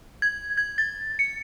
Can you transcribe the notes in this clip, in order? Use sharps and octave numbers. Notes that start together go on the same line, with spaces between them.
G#6
G#6
A6
C#7